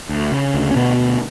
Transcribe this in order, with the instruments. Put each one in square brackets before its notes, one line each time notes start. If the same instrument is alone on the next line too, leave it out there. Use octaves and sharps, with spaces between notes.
[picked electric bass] D2
C#3
D2
C#4
D2 B2 B3
D2